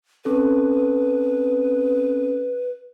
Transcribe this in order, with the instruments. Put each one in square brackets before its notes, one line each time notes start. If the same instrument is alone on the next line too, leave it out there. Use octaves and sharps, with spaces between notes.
[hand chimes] C4 C#4 A4 [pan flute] B4